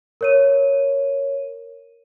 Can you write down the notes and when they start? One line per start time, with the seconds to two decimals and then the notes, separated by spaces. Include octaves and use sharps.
0.21 A#4 C#5 D#7